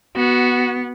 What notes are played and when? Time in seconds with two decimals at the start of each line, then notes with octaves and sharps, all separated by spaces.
0.16 B3 F#4